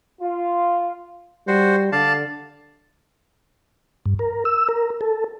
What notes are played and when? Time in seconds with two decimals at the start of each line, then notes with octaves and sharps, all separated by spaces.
0.22 F4
1.48 G3 F#4 C5
1.92 D3 D5 F5 A5
4.06 G2
4.19 A#4
4.45 E6
4.69 A#4
5.01 A4